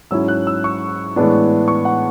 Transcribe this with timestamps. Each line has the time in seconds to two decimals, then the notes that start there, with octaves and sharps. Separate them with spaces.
0.11 G#2 F#3 C#4 E4 E6
0.28 F#6
0.47 E6
0.64 C#6
1.16 A2 E3 G#3 B3 D4
1.68 C#6
1.85 F#5